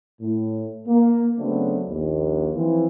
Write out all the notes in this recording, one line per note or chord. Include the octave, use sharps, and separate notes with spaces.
A2
A#3
C#3 F#3 A3 B3 C4 D4
A#1 D#2
E3 F3 C4